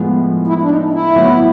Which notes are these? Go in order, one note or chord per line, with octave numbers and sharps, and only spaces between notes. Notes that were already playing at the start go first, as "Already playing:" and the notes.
Already playing: A2 F3 G#3 B3
E4
D4
D#4
E4
A2 F#3 B3